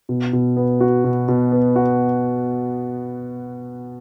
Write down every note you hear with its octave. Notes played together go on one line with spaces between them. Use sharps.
B2
B2
B3
F#4
B2
B2
B3
F#4